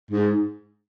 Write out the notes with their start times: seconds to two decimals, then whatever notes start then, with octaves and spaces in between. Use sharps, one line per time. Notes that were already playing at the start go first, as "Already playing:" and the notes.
0.11 G#2